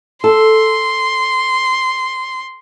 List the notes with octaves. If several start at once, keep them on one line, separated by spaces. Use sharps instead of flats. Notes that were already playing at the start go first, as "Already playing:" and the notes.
A4 C6